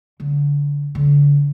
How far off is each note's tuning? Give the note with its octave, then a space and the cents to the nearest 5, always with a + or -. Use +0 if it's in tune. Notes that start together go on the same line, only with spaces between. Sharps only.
D3 -30
D3 -35